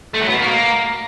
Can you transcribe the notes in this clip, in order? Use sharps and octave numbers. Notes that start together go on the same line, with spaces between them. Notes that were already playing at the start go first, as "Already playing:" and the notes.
A3
F#3
B3
B2
A#3